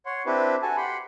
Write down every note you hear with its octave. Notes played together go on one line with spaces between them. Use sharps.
C#5 F#5 C6
C4 D4 E4 G4 B4
F#4 A4 G#5 A5
G4 F#5 B5 C6